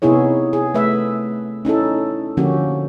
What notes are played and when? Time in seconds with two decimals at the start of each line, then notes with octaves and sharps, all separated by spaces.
0.02 C3 B3 D#4 E4 G#4 C#5
0.53 G#4
0.74 A3 B4 E5
1.65 C#4 D#4 E4 A4
2.37 D3 F3 A#3 C#4 F#4 G4